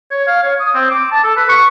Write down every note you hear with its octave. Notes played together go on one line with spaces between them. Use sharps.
C#5
F5
C#5
D#6
C4
D6
A5
A4
B4
C#6